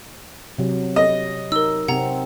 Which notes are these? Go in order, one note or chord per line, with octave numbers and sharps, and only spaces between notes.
C3 F#3
D#5
D#4 A#4 E6
C3 C4 F#5 A#5